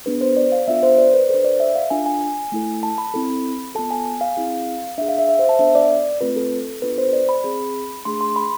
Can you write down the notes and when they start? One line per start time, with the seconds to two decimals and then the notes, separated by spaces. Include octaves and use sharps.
0.06 B3 D4 G#4 B4
0.21 C5
0.37 D5
0.52 F5
0.67 B3 D4 F4 A4 E5
0.83 C5
0.98 D5
1.14 B4
1.29 D4 A4 C5
1.44 D5
1.60 E5
1.75 F5
1.90 D4 F4 A4 G#5
2.06 G#5
2.21 G#5
2.52 A3 E4 A4
2.83 A5
2.98 B5
3.14 C4 E4 A4
3.75 B3 F4 A4 A5
3.91 G#5
4.06 G#5
4.21 F5
4.37 C4 E4 G#4
4.98 D4 G#4 E5
5.08 F5
5.18 E5
5.29 E5
5.39 C5
5.49 A5
5.59 B3 D4 A4 E5
5.75 D5
6.21 A3 C4 F4 A4 B4
6.36 A4
6.82 B3 D4 F4 A4 B4
6.98 C5
7.13 D5
7.29 B5
7.44 C4 G#4
8.05 A3 D4 G#4 C6
8.21 C6
8.36 B5